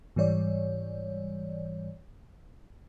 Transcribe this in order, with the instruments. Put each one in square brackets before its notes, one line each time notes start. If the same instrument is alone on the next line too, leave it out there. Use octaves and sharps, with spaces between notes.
[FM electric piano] G#2 E3 G3 C#5 D5